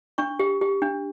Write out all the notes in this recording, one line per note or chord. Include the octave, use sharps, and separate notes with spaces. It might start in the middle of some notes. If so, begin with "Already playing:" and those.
D4 C#6
G4
G4
D4